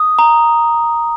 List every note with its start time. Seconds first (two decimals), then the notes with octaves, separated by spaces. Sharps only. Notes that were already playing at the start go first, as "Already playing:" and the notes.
Already playing: D#6
0.19 A#5